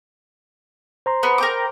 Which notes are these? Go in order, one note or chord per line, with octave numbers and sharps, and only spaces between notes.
C5 A#5 C6
B3
A#4 G5 D6